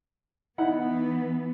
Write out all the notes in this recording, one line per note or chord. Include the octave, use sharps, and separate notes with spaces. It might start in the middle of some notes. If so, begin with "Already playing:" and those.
E3 B3 D#4 E4 F#5